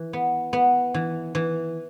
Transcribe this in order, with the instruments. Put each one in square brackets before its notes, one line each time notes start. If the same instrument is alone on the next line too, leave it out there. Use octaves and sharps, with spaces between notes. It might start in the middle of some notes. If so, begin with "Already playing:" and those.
Already playing: [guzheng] E3
B3
B3
E3
E3